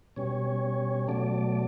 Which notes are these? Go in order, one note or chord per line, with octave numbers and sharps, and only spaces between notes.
B2 G3 C#4 C#5
B2 F#3 A3 D5